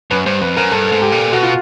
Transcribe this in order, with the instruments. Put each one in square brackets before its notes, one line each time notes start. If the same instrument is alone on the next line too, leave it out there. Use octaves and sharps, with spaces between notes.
[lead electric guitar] F#2 [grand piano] B4
[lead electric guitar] G2 [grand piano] C5
[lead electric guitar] F2 [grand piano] B4
[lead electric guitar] F#2 [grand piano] A#4
[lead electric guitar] G2 [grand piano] A4
[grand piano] A4
[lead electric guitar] G#2
[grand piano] G4
[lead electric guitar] A#2
[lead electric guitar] B2 [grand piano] F#4
[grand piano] F4